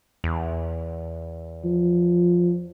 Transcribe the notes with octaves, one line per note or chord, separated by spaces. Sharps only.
E2
F3